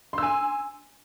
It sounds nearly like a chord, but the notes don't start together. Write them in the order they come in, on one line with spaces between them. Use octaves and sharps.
C6 E6 G#5